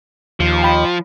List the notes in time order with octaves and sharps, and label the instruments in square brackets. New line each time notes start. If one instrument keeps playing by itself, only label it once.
[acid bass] D#2 [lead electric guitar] F3
[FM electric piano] G5 B5